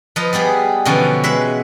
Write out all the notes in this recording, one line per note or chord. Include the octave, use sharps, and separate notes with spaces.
F3 B4 D#5 A#5
G3 B3 G4 G#4
B2 D3 E3 F3 C#4
G#3 B4 E5 F#5